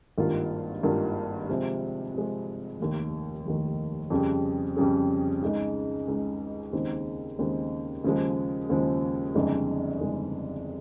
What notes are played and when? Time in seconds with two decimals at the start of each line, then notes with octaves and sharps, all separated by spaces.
0.18 G#1 G2 D#3 A#3 F4
0.83 G#1 G2 D#3 A#3 F4
1.49 C3 F3 G#3
2.14 C3 F3 G#3
2.80 F1 D#2 D#3
3.45 F1 D#2 D#3
4.10 F2 C#3 G3 C#4 G#4
4.77 F2 C#3 G3 C#4 G#4
5.42 C#2 C#3 G#3 D#4
6.08 C#2 C#3 G#3 D#4
6.73 D#2 C#3 G#3 C4 D#4
7.39 D#2 C#3 G#3 C4 D#4
8.04 D#2 C#3 F3 G#3
8.69 D#2 C#3 F3 G#3
9.35 G1 F2 C#3 G#3 D#4
10.00 G1 F2 C#3 G#3 D#4